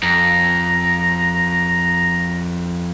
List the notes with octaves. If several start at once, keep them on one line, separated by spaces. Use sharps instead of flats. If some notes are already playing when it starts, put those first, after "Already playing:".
F2 A#5